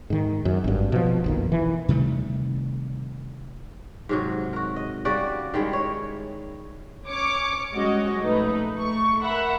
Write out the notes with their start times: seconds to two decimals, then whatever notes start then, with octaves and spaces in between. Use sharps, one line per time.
0.10 G#2 D#3
0.45 F#2
0.64 G#1 G2
0.92 B2 F3
1.24 F#1 B1 D#3
1.52 E3
1.88 C3 D#3 G3 A3
4.09 G#2 C3 F#3
4.53 F#4 A#4
4.76 D#5
5.05 C#3 G3 F#4 D5
5.54 D#3 G3 G#3 E4
5.73 C#5
7.07 C#4 C#5 D6 C#7
7.73 G3 G#3 C#4 F#4 C#5 D#5
8.19 A#1 A3 D#4 B4
8.78 A3 C#6
9.22 A#4 E5 F#5 B5